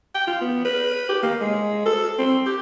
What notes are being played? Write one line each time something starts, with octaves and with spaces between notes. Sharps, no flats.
G5
F4
B3
B4
G4
A#3
G#3
A4
C4
G4